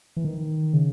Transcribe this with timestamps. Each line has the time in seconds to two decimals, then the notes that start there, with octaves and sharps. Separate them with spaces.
0.17 E3
0.25 D#3
0.73 C#3